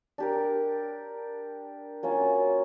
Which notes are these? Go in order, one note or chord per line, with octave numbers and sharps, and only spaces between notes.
D4 G4 A#4
F#3 A#3 C#4 F4